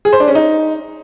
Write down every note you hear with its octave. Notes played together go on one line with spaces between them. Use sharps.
G#4
C5
D4
C#4
D#4